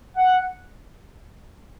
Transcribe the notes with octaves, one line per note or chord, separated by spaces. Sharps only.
F#5